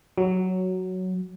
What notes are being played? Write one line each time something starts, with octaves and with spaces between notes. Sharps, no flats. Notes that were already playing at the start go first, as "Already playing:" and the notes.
F#3